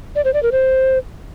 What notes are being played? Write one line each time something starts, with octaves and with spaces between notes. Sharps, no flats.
D5
C5
D5
A#4
C5